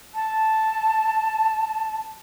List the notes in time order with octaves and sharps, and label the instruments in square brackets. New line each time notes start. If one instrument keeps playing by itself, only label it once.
[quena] A5